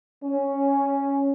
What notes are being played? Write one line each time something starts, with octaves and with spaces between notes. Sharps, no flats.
C#4